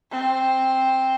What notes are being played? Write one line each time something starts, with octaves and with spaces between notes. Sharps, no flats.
C4